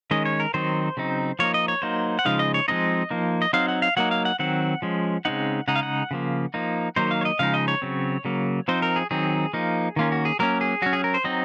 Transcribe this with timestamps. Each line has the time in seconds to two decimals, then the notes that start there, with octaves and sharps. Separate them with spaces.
0.11 D#3 G#3 C#4 D#5
0.25 C#5
0.40 A#4
0.54 D#3 F#3 C4 D#4 C5
0.97 C#3 F#3 C4 D#4
1.39 F3 A#3 D#4 C#5
1.54 D#5
1.68 C#5
1.82 F#3 A#3 D#4 C5
2.19 F#5
2.25 C#3 F3 G#3 D#4 F5
2.39 D#5
2.54 C#5
2.68 F3 G#3 C4 D#4 D#5
3.11 F3 A#3 D#4
3.42 D#5
3.53 F#3 C4 D#4 F5
3.68 F#5
3.82 F5
3.97 F#3 A#3 D#4 F#5
4.11 F5
4.25 F#5
4.39 D#3 F#3 C4 F#5
4.82 F3 G#3 C#4
5.25 C#3 G#3 C4 D#4 F#5
5.68 C#3 G#3 D#4 F#5
5.76 F5
5.83 F#5
6.11 C#3 F3 A#3
6.54 F3 A#3 D#4
6.96 D#3 F#3 A#3 D#4 C5
7.11 F5
7.21 C#5
7.25 D#5
7.39 C#3 F3 G#3 D#4 F5
7.54 D#5
7.68 C#5
7.82 C#3 F#3 C4
8.25 C#3 F#3 A#3
8.68 F3 C4 D#4 C5
8.82 A#4
8.96 G#4
9.11 D#3 F#3 C4 D#4 G#4
9.53 F3 A#3 D#4
9.96 D#3 A#3 C#4 F4
10.12 F#4
10.25 G#4
10.39 F#3 A#3 C#4 A#4
10.61 G#4
10.82 F#3 C#4 F#4
10.93 G#4
11.04 A#4
11.14 C5
11.24 F#3 C4 D#4 D#5